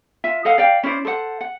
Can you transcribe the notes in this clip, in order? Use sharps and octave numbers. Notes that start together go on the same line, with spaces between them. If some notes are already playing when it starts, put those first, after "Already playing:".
F4 E5
A4 D#5 F5 F#5
D5 F5 G5
C#4 E4 C5 D5
A4 C5 D5 F#5
F#5